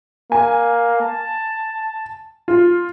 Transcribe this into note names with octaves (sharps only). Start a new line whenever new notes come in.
A#3 G#5
A5
F4